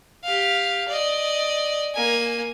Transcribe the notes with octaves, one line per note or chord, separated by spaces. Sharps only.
G4 F5
D5 D#5
A#3 G#5